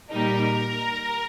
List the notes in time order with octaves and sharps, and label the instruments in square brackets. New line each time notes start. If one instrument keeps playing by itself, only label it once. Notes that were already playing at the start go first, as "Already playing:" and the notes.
[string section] A#2 G3 D#4 A#4